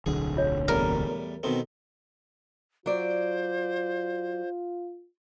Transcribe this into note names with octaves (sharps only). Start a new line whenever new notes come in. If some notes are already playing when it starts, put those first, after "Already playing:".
D1 B1 D3 G#4
F4 C#5
E2 A2 G3 A#4
B2 D#3 C4 A4
F#3 F4 C5 D5